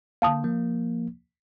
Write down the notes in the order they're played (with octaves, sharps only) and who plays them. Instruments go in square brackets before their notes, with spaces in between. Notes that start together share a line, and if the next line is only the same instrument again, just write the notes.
[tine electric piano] D3 A#3 [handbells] F5 A5 D#6
[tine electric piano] F3 A#3